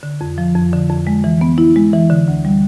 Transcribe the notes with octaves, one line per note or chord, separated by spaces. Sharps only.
D3
F2
F3
F2
D3
F2
G#3
E3
B3
E4
G#3
E3
D3
D2
G3